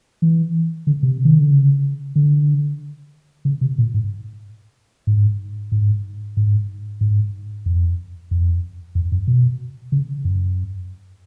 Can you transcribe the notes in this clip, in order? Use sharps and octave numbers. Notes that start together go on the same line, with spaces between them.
E3
D3
C3
D#3
D3
C#3
D3
C#3
C3
A#2
G#2
G#2
G#2
G#2
G#2
F2
F2
F2
F#2
B2
C#3
F#2